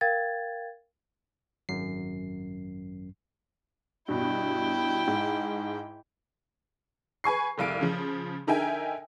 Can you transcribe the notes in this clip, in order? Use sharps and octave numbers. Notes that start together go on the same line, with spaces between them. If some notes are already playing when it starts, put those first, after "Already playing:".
A#4 F5 G5 G#6 A6
G#1 F#2 C7
G2 B2 E4 G5
G#2
B4 G#5 C#6 C7
F1 C2 F5 D7
C#3 F3
D3 D#4 A#4 E5 G5 G#5